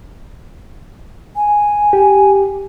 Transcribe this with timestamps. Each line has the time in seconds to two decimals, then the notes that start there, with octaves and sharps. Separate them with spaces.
1.36 G#5
1.93 G4